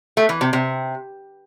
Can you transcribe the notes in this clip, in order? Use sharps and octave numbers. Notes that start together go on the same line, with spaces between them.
A3
E3
C3
C3